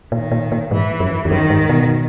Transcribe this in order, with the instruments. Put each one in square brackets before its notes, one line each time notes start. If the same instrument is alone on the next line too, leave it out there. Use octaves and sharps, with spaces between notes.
[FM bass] A#2 [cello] D#3
[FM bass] A#2
A#2
[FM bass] G#2 [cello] E3
[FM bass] F#2
E2
[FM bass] F#2 [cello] D#3
[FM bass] G#2
B2